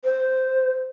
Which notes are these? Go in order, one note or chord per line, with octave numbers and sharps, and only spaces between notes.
C5